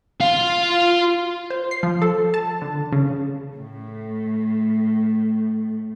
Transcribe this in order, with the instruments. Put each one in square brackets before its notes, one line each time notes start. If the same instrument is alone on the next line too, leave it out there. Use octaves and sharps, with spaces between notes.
[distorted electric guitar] F4 F5
[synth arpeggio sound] C5
C7
F3
A4
A5
D3
C#3
[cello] A2 A3